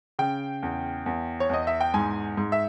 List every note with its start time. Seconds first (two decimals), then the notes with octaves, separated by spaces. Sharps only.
0.19 C#3 G5
0.63 E2
1.06 E2
1.40 C#5
1.50 E2 D#5
1.67 E5
1.81 G5
1.94 G#2 G#5
2.37 G#2
2.52 E5